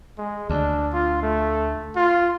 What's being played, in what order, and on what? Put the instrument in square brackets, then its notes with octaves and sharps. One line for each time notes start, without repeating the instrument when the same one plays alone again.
[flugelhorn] G#3
[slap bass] D2 [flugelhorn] D4
[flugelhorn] F4
A3
F4